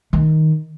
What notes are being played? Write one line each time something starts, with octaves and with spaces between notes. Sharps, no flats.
D#3